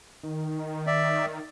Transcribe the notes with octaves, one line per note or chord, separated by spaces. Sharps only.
D#3
D5 E5